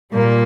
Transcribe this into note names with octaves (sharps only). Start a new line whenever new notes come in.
A#2 G3 A#3